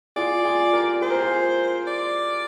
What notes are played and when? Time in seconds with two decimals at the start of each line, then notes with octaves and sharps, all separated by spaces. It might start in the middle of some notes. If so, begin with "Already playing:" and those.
0.16 F4 G#4 D5
0.45 F4 G#4
0.73 G4 A#4
1.01 G#4 C5
1.10 A#4
1.20 F4 G#4
1.87 D5